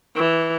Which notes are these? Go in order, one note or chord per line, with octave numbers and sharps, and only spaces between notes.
E3